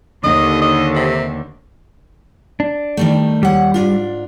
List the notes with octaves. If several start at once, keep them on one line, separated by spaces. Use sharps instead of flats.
D#2 D3 D#5
D#5
C3
D4
D#3 G3 A3
D#2 G3 F#5
G#2 D4 F4